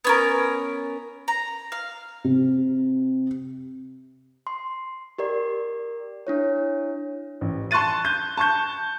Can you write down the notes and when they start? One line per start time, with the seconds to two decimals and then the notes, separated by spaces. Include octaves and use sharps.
0.04 B3 C#4 A#4
1.28 A#5
1.72 F5
2.24 C3
4.47 C6
5.18 G4 A#4 D5
6.27 D4 E4 C#5
7.41 A1
7.71 A5 C6 C#6 F#6 A6 D#7
8.05 G6
8.37 A5 C#6 G6